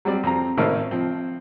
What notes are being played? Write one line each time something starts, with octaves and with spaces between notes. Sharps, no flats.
F#3 G3 C4 D5
F2 C4 A#5
G#1 A2 D#4 A#4 C5 F6
F3 C4